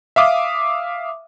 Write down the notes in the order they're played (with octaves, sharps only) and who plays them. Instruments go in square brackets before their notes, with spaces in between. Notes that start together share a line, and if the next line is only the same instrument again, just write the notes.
[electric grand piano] E5 F5 D6 D#6